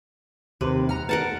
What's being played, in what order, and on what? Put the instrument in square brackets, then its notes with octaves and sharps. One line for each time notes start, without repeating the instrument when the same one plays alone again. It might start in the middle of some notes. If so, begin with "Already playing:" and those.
[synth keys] D#2 C3 [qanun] B4
[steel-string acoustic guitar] F#5 A#5 [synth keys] F6
[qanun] A#4 F#5 A5 [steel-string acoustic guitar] B4